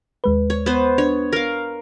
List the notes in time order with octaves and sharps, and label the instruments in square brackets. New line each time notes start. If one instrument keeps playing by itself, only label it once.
[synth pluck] D#2 G#3 B4
[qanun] C#5
B3 C5
[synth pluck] D4 [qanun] C#5
[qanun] A#4 F5